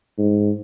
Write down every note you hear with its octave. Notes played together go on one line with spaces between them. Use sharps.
G#2